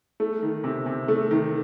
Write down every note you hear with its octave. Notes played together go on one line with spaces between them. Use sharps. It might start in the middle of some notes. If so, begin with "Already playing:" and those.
A3
D#3
C3
C3
A3
D#3